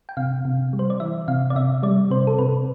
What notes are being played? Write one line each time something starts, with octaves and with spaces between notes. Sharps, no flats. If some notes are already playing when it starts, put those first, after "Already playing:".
G5
C3 F5
C3
G3
C5
D5
E3 E5
C3 F5
D5
C3 E5
G3 D5
C3 C5
A4
C3 B4